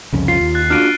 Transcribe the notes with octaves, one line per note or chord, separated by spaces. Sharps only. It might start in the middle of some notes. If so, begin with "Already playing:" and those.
C2 F2 C#3
F4 C7
D#2
F#6 A6
D4 F4 F#4 F6 D7 D#7